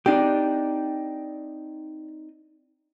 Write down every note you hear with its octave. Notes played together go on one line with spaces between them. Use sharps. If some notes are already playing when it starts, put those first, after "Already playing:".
C4 D4 D#4 G4 D5